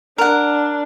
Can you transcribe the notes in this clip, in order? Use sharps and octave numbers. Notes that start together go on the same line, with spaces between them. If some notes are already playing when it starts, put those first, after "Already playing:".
D4 A#4 F#5